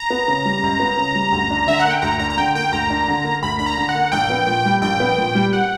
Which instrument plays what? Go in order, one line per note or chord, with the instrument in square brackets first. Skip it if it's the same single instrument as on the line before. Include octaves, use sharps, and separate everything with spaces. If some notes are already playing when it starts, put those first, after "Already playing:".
Already playing: [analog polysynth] A#5
[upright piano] B3
C#3
G3
C#2
B3
C#3
G3
D2
D4
[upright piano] D3 [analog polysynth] E5
[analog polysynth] F#5
[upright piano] A#3
[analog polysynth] G5
[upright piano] D2 [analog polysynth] A#5
[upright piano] D4 [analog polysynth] A#5
[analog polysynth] A#5
[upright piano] D3 [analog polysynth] G5
[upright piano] A#3 [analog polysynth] G5
[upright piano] D2 [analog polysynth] A#5
[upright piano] D4
D3
A#3
[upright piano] D2 [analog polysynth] B5
[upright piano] D4 [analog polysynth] B5
[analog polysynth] A#5
[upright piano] D3
[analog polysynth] F#5
[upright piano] A#3
[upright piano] A#1 [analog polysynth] G5
[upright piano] B3
A#2
G3
[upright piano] A#1 [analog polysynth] G5
[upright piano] B3
A#2
G3
[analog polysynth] F#5